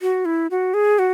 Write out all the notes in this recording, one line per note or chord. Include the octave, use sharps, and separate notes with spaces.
F#4
E4
F#4
G#4
F#4